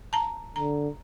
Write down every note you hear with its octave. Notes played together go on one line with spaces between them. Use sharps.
A5 A#5
D3 A#5